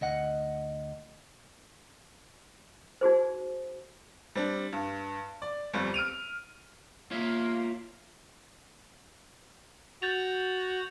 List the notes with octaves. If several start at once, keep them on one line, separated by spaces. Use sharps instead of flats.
D2 D#5 F#5
D#4 F#4 G#4 C5
G3 C4 D4
G2
D5
G1 F2 G3
F6 D7 D#7 F7
A#3 F4 C#5 E5
F#4 G6 A6 F7